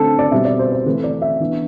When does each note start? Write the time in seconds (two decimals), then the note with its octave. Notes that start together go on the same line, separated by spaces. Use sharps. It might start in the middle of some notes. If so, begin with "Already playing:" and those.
Already playing: D3 A3 C4 A4
0.19 D5
0.31 B2 G3 C4 E5
0.45 D5
0.59 C5
0.72 C5
0.86 E3 A3 C4 B4
1.04 D5
1.22 E5
1.40 E3 B3 D4